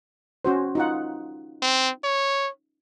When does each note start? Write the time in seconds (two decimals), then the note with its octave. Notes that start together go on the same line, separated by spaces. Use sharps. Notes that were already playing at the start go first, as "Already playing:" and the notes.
0.45 C#4 F#4 C5
0.75 D#4 F4 F#5
1.62 C4
2.04 C#5